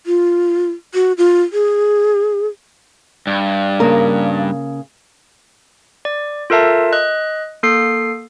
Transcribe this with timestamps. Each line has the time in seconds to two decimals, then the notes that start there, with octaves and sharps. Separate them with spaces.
0.06 F4
0.94 F#4
1.18 F4
1.53 G#4
3.27 G2
3.80 C#3 A#3 A#4
6.05 D5
6.50 F4 A4 A#4 E5 A5
6.93 D#5 F#6
7.63 A#3 A4 C7